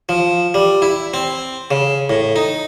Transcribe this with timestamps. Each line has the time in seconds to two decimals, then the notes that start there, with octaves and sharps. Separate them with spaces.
0.09 F3
0.54 G3
0.82 E4
1.14 C4
1.71 C#3
2.10 A2
2.36 D#4